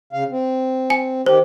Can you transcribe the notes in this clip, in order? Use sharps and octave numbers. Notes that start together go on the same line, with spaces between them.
C#3 F5
C4
G#5
D#3 G4 C5